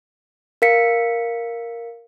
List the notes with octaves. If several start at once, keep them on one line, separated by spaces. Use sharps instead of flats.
A#4 F5 B6 C#7